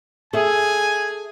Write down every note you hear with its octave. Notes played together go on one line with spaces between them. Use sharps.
G#4 A4 E5 G#5